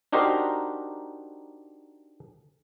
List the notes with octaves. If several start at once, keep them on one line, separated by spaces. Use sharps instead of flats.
D4 D#4 F#4 G4 A#4 C5